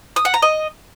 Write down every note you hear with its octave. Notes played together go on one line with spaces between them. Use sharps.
D#6
F#5
A#5
D#5